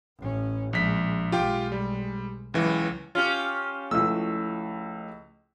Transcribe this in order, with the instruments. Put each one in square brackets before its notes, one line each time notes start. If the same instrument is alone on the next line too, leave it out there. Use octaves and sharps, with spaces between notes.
[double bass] A1 C#4
[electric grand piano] A#1 B6 [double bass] G#3
[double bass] B1 G#3 [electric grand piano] F4 G4 G5
[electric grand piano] G3
[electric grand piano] C#2 E3 [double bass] F#3
[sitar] C#4 G4 [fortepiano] F4
[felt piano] C#2 F3 [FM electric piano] A3 E4 D#5 [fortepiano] E6